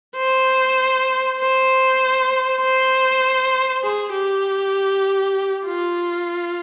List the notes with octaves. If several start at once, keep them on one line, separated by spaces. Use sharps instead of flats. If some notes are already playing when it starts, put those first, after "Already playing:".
C5
C5
C5
G#4
G4
F4